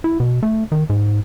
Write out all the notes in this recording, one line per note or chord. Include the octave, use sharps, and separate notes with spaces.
E4
B2
A3
D#3
G#2